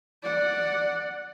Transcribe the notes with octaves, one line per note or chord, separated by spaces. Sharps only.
D5 F#5